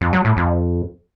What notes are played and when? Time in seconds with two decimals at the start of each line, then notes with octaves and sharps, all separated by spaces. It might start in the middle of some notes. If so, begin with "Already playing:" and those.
0.01 F2
0.13 F#3
0.25 A2
0.37 F2